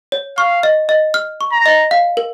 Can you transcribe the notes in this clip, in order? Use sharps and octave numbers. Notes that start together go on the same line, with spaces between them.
C#5
F5 C#6
D#5
D#5
F6
C#6
A#5
D#5
F5
A#4